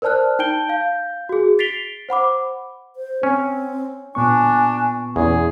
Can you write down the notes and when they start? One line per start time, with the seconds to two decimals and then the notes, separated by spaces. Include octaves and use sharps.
0.02 A#4 C5 D5 A5 F6 F#6
0.39 D#4 G5 A5 G6 D7 G7
0.69 F5 G6
1.29 F#4 G#4
1.59 A6 B6 C7 D7 F7 G7
2.09 C5 F#5 B5 D6
2.96 C5
3.23 C4 C#4
4.15 A#2 B3 D4 G#5 C#6
5.16 E2 C#4 G#4